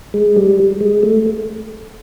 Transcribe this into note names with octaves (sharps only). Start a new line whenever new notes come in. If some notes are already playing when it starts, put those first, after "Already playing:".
G#3
G3
G#3
A3